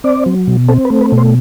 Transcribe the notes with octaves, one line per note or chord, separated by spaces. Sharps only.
C4 D5
F#3
B2
C4 A4
B4
A3
B4
B2
C5